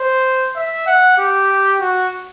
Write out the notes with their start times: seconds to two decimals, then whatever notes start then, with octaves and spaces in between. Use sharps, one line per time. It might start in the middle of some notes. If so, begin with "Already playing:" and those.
Already playing: C5
0.56 E5
0.87 F#5
1.18 G4
1.80 F#4